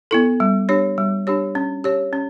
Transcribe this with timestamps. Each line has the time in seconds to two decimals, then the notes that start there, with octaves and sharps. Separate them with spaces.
0.11 B3 E4 A4
0.40 G3
0.69 D4 G4 C#5
0.98 G3
1.27 D4 G4 C#5
1.55 C#4
1.84 G4 C#5
2.13 C#4